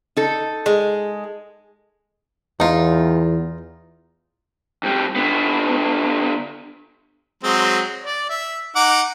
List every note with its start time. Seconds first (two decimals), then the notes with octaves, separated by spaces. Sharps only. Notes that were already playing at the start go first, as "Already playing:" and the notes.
0.17 D#4 A4
0.66 G#3
2.60 E2 D#4 F4
4.83 F2 G3
5.16 D3 B3
7.43 F#3 G#3 C4
8.04 D5
8.29 E5
8.76 D#4 F#5 D6